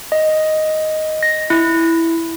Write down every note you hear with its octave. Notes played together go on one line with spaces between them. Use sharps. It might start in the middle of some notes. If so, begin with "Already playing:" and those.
D#5
A#6
E4